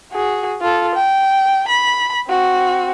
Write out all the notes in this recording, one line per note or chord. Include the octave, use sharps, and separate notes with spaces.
F#4 G#4
F4 A4
G5
B5
C4 F#4